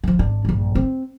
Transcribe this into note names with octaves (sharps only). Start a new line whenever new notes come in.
E3 F3
G#1 D4
A#1 G2
C4